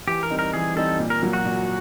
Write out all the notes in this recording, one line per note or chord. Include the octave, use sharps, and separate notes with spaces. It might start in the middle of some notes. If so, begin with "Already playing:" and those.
E3 G4
A#4
G3 C4 D#4
A#4
E3 G#4
G3 C4 D#4 A4
A#2
A#4
F#3 A#3
F#4
A#2